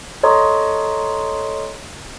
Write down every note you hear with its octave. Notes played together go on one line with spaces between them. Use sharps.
A4 C#5 D#5 A#5 C6 D#6